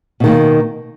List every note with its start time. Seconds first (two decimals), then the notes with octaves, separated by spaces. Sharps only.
0.20 B2
0.24 D#3
0.27 A#3